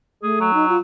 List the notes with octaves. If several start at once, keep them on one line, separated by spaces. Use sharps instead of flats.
A3 G#4
F#3
D#4
F4